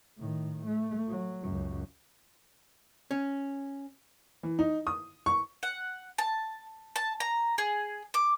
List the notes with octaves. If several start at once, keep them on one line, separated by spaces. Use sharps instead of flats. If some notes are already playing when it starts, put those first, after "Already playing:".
A2 D#3
A3
F#3
C#2 F#2
C#4
E3
D#4
D#6
C#6
F#5
A5
A5
A#5
G#4
D6